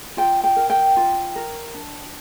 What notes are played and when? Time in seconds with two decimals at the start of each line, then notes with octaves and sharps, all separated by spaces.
0.17 F4 G5
0.44 G5
0.56 A#4
0.70 G5
0.97 F4
1.36 A#4
1.74 D4